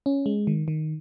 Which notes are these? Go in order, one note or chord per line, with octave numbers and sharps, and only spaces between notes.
C#4
G#3
D#3
D#3